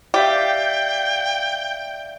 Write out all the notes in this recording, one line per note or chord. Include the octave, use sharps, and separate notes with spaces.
G4 D5 E5 F5 G5